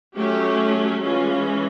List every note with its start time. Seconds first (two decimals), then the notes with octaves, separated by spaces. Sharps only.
0.15 F#3 A3 C#4 G4
1.02 E3 G#3 C#4 F4